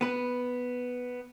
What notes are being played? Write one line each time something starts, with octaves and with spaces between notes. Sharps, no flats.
B3 B4